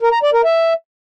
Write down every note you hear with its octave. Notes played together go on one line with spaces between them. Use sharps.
A#4
A#5
D5
A#4
E5